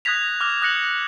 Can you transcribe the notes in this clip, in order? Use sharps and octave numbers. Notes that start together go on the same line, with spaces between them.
D#6 F#6 G#6 A#6 B6 F7
D6 F6 A#6 F7
D#6 F#6 A#6 C#7 F#7